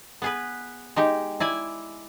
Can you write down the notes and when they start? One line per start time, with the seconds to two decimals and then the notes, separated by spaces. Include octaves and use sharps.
0.22 B3 G#4 B4
0.96 G#3 D#4 G4
1.40 E4 D5 G#5